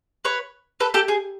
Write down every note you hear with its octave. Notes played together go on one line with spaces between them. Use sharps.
B4 C#5
A4 B4
G4 A4
G#4